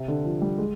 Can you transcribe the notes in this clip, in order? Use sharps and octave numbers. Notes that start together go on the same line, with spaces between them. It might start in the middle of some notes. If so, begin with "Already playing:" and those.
Already playing: C3
D3
F3
G3
G#3